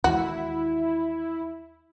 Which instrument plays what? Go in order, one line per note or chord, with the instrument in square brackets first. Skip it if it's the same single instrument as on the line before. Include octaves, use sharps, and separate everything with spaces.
[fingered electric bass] D#2 E3 G#3 [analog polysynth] E4 [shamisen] F#4